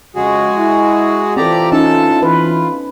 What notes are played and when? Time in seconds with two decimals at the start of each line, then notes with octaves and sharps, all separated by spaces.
0.16 F2 C#3 G#3 F#4 G#4
0.57 E4
1.36 E3 C4 F4 G4 A4 D5 A#5
1.72 C#4 D#4 A4 A5
2.23 E3 F4 B4